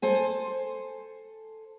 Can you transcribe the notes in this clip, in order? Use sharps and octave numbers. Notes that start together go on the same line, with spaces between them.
A4 C5 G#5